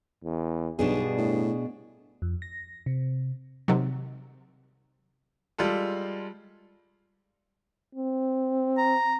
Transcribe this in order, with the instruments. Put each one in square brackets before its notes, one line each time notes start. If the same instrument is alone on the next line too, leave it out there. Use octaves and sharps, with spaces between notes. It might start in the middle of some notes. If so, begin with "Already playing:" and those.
[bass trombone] E2
[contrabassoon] B1 [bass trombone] G2 [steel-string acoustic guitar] B2 D4 G#4
[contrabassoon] A2
[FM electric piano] F2
A#6
C3
[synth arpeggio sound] C3 D#3 F#3
[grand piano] G3 G#3 F4 A4
[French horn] C4
[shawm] A#5